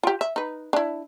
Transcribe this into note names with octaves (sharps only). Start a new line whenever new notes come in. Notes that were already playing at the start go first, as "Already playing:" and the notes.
F4 G4
E5
D#4 B4
D4 E4